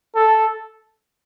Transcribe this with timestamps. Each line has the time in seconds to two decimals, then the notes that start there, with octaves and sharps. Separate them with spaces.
0.15 A4